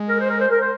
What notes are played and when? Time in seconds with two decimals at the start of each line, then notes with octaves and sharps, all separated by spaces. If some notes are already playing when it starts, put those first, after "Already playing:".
Already playing: G#3
0.08 A#4
0.19 C5
0.29 A#4
0.40 C5
0.50 A#4
0.60 C5